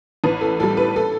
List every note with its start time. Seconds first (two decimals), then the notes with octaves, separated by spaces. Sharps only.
0.24 A1 B4
0.41 A4
0.59 A2 G3 A4
0.77 B4
0.96 A4